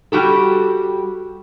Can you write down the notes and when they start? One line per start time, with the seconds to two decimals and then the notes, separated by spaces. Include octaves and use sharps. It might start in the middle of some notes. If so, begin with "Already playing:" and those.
0.12 G3 F#4 G4 A4